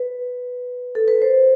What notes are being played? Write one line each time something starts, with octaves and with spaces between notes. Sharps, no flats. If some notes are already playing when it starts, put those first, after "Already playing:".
Already playing: B4
A4
B4
C5